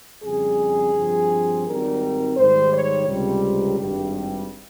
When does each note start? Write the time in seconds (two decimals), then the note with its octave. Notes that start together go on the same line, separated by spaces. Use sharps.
0.24 F2 C#3 G3 G#4
0.95 G2 F3 C4
1.66 G#1 G#2 G3 C4 D#4 A#4
2.37 G#2 D#3 G3 C5
2.72 C#5
3.08 C#2 C3 G3
3.79 G#1 G2 G3